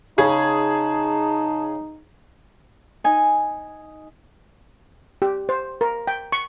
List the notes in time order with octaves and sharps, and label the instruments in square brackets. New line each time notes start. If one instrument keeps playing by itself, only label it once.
[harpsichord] C#3 [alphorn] D#4 [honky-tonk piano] G#4 [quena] A5
[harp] D#4 G#5
[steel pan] G4
C5
A#4
G5
C#6